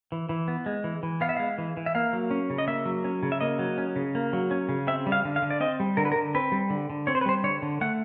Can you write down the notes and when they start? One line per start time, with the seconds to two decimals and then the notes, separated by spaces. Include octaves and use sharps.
0.12 E3
0.29 E3
0.48 B3
0.66 G#3
0.84 E3
1.03 E3
1.21 B3 F5
1.29 E5
1.37 G#3 F5
1.58 E3
1.77 E3
1.86 E5
1.95 A#3 F5
2.13 F#3
2.31 C#4
2.50 C#3
2.58 D#5
2.68 A#3 E5
2.86 F#3
3.04 C#4
3.23 C#3
3.32 E5
3.41 A#3 D#5
3.59 F#3
3.78 C#4
3.96 C#3
4.15 A#3
4.33 F#3
4.51 C#4
4.69 C#3
4.87 C4 E5
5.06 G3
5.12 F5
5.25 D3
5.36 F5
5.42 D3
5.50 D5
5.60 C4 D#5
5.80 G3
5.97 D3 A#4
6.05 B4
6.12 A#4
6.16 D3
6.35 C4 B4
6.52 G3
6.70 D3
6.90 D3
7.07 C4 C#5
7.15 C5
7.21 B4
7.26 G3 C5
7.43 D3 C#5
7.62 D3
7.81 A3 F#5